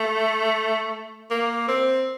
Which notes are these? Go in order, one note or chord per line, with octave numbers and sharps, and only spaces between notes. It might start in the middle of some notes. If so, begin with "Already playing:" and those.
Already playing: A3
A#3
C4